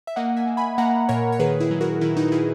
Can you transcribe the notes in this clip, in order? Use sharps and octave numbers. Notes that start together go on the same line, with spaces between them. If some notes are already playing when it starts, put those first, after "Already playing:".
E5
A#3 D#5 F#5
E5 G#5
A#3
G#5 B5
A#3 F#5 A#5
A#2 A#4 C#5
C#5
D#3 G#4 B4
E4 G#4
F#3
F#4 A#4
D#3 E4
D#4 F#4
D#3 E4 G#4